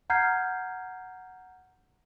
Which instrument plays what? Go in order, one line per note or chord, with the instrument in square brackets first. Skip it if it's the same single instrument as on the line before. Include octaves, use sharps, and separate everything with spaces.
[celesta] F#5 A#5 F6 G6 G#6 C7